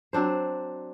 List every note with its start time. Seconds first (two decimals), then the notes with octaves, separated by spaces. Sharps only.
0.13 F#3 C4 D4 C5